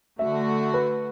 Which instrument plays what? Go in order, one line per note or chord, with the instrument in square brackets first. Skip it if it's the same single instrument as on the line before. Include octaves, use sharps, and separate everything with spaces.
[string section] D3 A3 F#4 [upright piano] E5
[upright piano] B4